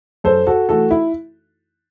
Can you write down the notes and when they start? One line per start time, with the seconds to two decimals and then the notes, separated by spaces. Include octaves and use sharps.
0.24 F#2 A4 C5
0.47 F#4 A4
0.69 E3 A3 F#4 A4
0.91 E4